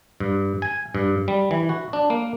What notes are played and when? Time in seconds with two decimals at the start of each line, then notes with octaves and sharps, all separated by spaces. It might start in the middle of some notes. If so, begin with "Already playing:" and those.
0.20 G2
0.62 G#5
0.95 G2
1.28 G3
1.51 E3
1.69 F#4
1.93 D4
2.10 A#3